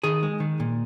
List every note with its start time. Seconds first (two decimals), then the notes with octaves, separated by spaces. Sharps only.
0.04 D#3 G#4
0.23 G#3
0.40 D#3
0.60 A#2